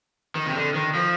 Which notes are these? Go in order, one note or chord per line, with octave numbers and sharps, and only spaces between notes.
D#3
C3
D3
D#3
F3